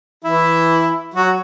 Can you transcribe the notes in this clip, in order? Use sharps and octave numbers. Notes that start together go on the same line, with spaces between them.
E3 E4
F#3 F#4